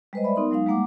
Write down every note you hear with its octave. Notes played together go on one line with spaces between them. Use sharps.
G3 G#3 B4 C5 D#5
D5 E5 B5
B3 D#4 A#4 C6
F#3 G#3 D#4 F5
G3 G#3 A#3 F#5 D6